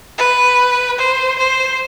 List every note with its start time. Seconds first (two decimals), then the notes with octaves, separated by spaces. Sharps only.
0.18 B4
0.98 C5
1.38 C5